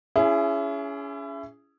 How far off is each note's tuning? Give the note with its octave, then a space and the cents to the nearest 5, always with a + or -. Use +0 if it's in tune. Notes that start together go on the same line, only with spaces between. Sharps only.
C#4 +30 E4 +30 G#4 +0